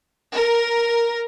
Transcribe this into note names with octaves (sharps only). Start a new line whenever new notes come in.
A#4